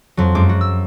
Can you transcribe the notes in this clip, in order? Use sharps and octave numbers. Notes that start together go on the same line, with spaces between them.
F2 F#3
F#2 G#3 D6
F#4
E6